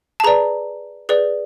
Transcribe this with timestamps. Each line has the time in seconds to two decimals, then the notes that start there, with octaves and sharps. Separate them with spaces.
0.20 A5
0.24 G#4 B4 D5 A#5
1.09 G#4 B4 D5